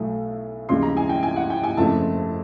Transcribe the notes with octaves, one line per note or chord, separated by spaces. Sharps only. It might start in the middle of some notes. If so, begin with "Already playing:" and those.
Already playing: B1 A2 F#3 A3
D#2 C#3 F3 G#3 C6
A#5
G#5
G5
G#5
F#5
G5
G#5
F#1 F2 C#3 F3 A3 A5